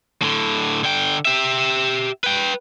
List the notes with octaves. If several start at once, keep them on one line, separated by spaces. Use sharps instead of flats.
A2 D3
D3 G5
G4 E5
B4 G5